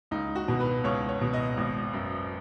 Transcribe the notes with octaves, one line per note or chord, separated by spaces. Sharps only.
C#2 D#4
F#4
B2
B4
C#2 C#5
C#5
B2
D#5
G#1
F#2